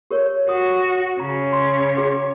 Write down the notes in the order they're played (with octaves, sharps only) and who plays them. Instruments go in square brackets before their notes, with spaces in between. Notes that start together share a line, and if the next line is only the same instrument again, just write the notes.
[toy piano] G4 A#4 C#5
[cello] F#4 [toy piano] F#5 D#6
[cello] C#3 C#5 [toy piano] A#5
[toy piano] C6
F#4 G#4 F#5